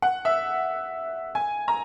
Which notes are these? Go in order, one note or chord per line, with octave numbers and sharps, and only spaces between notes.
F#5
E5
G#5
A#5